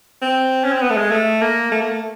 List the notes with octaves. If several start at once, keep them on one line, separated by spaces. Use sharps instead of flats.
C4
C#4
C4
B3
A3
G#3
A3
A#3
A3
A#3
A3